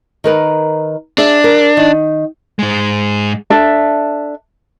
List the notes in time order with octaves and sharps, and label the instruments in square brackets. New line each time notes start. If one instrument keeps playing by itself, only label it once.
[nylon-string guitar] D#3 A#4 B4
[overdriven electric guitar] D4 [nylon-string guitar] G#4 E5
[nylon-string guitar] A#4
D#3
[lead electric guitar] G#2 G#3
[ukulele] D4 A4 E5